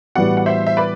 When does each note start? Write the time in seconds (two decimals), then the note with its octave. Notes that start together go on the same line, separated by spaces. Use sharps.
0.15 A2 E3 G3 B3 F#4 D5 F#5
0.37 F#5
0.46 C5 E5
0.67 E5
0.77 B4 D5